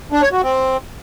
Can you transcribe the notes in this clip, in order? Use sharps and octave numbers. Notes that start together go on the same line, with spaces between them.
D4
C#5
F#4
C4